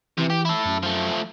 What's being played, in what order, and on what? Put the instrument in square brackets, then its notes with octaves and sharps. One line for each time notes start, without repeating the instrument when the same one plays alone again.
[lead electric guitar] C3 [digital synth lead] E3
[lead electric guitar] G4
E4 A4
[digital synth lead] F#2
[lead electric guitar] F3 A3